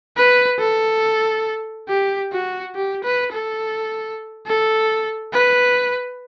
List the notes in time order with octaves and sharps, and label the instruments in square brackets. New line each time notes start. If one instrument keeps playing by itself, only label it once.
[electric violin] B4
A4
G4
F#4
G4
B4
A4
A4
B4